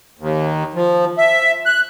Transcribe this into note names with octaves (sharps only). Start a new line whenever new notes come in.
D#2
F3
E5
F#6